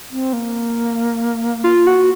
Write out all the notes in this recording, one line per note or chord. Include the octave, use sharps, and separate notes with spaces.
C4
A#3
F4
F#4